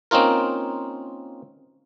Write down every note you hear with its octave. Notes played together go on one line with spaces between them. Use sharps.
A#3 C4 C#4 D#4 F4 A#4